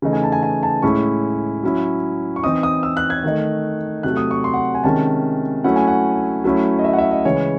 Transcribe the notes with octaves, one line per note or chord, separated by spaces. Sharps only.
C#3 E3 A3 D#4
G#5
A5
G#5
G#5
A5
A2 G#3 C#4 E4 C#6
F#3 C#4 E4
C#6
E3 C4 D#4 D#6
D#6
E6
F#6
G#6
D#3 A3 D#4
C3 F#3 A3 F#6
D#6
C#6
C6
F#5
G#5
C3 D#3 G#3 C#4 A5
F#3 A3 C#4 E4 F#5
G#5
F#5
F#3 A3 C#4 E4
D#5
E5
F#5
E5
D#5
C#3 E3 G#3 C#5